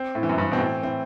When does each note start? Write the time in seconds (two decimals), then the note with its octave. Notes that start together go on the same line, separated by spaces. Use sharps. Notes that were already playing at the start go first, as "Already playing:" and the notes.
Already playing: C4
0.15 A2
0.23 E3
0.29 F#2
0.38 G2
0.51 B2 C4
0.60 A2
0.83 A2 C4